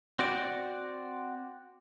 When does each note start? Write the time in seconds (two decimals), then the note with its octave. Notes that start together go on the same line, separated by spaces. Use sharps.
0.19 C4 F#4 D5